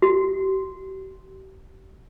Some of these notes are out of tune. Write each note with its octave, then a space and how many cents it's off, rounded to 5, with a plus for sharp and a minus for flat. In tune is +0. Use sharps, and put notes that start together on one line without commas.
G4 -45